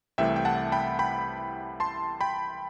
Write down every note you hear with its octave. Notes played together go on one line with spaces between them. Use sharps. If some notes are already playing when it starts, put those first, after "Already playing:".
C2 C3 E3 A3 E5 G5
G5
F#5 A5
G5 B5
G5 B5
A5 C6
G5 B5